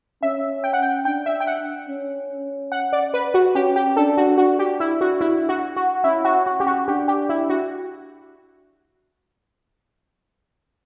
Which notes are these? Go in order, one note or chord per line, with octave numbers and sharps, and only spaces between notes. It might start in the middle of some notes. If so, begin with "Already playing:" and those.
C#4 E5
G5
F#5
G5
D4 G5
E5
G5
F#5
C#4
F#5
D5
B4
F#4
C#4 G4
G4
D4 A4
F#4
D4 F#4
G4
E4
F#4
E4
F#4
F#4
C#4 E4
F#4
F#4
G4
F#4
D4 G4
G4
E4
F#4